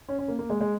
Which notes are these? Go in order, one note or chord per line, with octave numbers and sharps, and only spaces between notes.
C#4
C#4
A#3
A#3
G#3
G#3